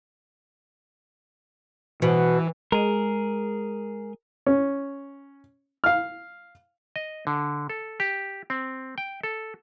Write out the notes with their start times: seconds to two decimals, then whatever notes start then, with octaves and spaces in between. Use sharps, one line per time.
2.02 B2 E3
2.72 G#3 G#4 A#4
4.46 C#4
5.84 F5 F6
6.96 D#5
7.27 D3
7.69 A4
8.00 G4
8.50 C4
8.98 G5
9.23 A4